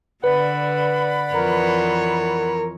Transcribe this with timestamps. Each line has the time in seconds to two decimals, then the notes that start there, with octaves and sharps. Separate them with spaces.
0.24 D3 B4 D5 F#5 B5
1.33 F2 E3 A#4 C#5